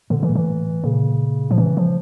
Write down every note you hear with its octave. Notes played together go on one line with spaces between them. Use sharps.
A#2 D3
C#3 E3
A#2
A2 E3
A#2 C#3
A#2 F3
C#3 E3
F3